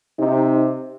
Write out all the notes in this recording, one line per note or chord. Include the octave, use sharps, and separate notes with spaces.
C3 D#4